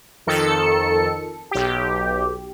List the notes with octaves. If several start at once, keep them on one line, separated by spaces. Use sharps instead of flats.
F2 D#3 A4 C#7
B1 G4